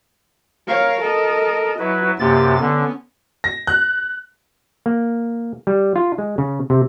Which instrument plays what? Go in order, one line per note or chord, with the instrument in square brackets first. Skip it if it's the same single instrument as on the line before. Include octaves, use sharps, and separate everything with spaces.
[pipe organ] A#4 [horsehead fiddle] C#5 F5
[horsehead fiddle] A4 D#5
[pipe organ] F#3 B4 [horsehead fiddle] E4
[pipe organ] F#2 C3 A6 [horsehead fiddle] A#3 G4
[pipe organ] D3 [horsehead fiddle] B3 C#4
[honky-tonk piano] A#6
F#6
[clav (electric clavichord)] A#3
G3
F4
G#3
C#3
C3